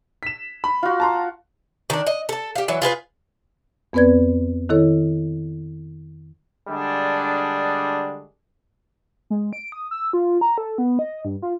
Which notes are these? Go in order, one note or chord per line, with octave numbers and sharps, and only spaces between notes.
B6 E7
B5
F4 F#4
A5 A#5 C6
D#3 D4
D#5
A4 A5
G4 F5
E3 F#3
F4 G#4 B4 F5
F2 B3 C4 B4 D5 G#6
D#3 E4 A4 C#5
D3 G3 G#3 D4
G#3
D7
D#6
E6
F4
A#5
A4
B3
D#5
G2
F4